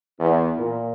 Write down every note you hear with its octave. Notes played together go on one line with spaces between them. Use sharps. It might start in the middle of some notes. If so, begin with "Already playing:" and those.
E2
A#2